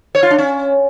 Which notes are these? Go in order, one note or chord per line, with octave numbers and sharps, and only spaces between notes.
C#5
F4
D4
C#4